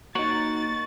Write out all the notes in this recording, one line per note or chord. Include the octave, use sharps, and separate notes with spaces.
A#3 D#4 F#4 C#5 F#5 C#6 A6